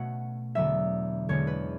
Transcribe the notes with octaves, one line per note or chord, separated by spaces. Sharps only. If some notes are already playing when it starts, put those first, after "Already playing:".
Already playing: B2 A3 C#4 F#5
E2 D3 F#3 B3 E5
E2 D3 G#3 C#4 C#5
B4